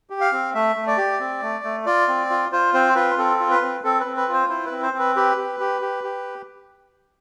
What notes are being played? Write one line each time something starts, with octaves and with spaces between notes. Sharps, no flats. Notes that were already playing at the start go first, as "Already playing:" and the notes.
G4
F5
C4
A3 E5
A3
D5
G4
C4
A3
A3
F4 D5
C4
F4
F4 C5
C4 C5
F4 B4
C4 A4
F4
B4
C4
C4 A4
B4
C4
B4
F4 C5
E4 C5
C4 B4
C5
C4
B4
G4 B4
G4
G4
G4
G4